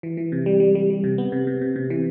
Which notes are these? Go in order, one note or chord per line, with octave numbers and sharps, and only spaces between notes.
E3
E3
C3
G3
G3
G3
G3
C3
B3
C3
C3
C3
C3
E3